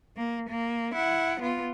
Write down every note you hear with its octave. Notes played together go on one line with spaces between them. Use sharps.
A#3
A#3
E4 F#5
B3 F4